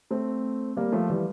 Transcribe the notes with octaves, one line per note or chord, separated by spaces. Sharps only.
A3 C4
G3 A#3
F3 A3
E3 G3